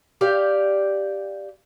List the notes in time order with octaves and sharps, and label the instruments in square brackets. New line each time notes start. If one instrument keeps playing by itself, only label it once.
[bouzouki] G4 D5 F5